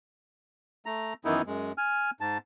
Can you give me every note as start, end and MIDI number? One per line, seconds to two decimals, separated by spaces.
0.86 1.13 57
0.86 1.13 82
1.25 1.42 42
1.25 1.42 51
1.25 1.42 52
1.25 1.42 59
1.25 1.42 63
1.25 1.42 64
1.46 1.72 42
1.46 1.72 56
1.78 2.10 80
1.78 2.10 89
2.21 2.38 44
2.21 2.38 81